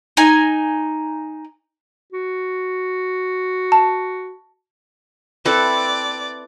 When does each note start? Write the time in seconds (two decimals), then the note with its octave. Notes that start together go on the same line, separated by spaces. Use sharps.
0.17 D#4 G#5
2.13 F#4
3.72 A5
5.45 C4 E4 A4 B4 D5